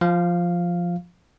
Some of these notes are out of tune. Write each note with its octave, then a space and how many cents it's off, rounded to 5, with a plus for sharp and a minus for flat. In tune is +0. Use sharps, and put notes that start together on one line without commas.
F3 +0 F5 +0